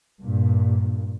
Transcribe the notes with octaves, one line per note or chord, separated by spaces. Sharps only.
G2 A#2